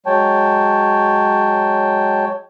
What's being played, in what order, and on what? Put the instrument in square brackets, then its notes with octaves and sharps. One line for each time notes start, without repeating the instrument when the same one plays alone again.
[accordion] F#3 G#3 C#5 G5 A5